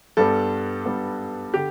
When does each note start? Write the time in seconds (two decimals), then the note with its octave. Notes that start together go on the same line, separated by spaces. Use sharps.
0.17 G2 G3 B3 A4
0.85 G2 G3 B3
1.54 D3 G4